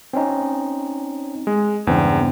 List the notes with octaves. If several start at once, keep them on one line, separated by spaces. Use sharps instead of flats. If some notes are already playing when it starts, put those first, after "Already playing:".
C4 C#4 D#4
G#3
E2 G2 C#3 C4